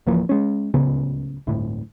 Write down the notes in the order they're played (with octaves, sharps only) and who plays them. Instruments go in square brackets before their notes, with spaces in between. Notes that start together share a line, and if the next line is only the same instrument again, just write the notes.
[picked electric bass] D1 E3 F3 A#3
G#3 C#4
D1 C#2 C#3 B3
G1 D2 A2